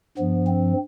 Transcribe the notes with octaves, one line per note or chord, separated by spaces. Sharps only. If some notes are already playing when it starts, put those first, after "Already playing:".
G2 F3 B3
C4